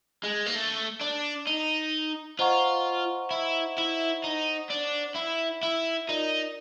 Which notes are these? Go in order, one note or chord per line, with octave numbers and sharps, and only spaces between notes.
G#3
A#3
A3
D4
D#4
F4 C5 D#5 F#5 A#5 C#6
E4
E4
D#4
D4
E4
E4
D#4 F4 A#4 D5